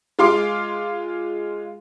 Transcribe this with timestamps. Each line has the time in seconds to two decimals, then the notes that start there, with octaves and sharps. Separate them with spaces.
0.19 G#3 F4 F5 C6 D6